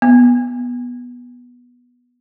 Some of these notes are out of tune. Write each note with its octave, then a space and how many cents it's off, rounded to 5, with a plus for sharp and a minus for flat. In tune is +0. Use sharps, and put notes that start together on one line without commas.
B3 -10